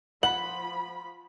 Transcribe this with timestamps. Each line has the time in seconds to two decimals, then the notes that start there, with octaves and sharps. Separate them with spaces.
0.23 F3 F#5 B5 F#7